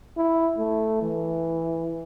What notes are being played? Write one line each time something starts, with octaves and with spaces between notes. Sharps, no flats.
E4
A3
E3